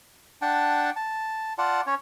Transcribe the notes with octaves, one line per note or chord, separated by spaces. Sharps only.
D4 F#5 G5 A5
A5
F4 D5 F#5 A5
C#4 C#5